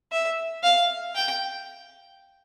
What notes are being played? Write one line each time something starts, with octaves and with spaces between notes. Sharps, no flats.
E5
F5
G5